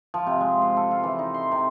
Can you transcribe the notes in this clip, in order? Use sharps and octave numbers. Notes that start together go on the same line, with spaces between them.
F3
C3
G#3
C5
A4
F4
E3
D#4
C6
C3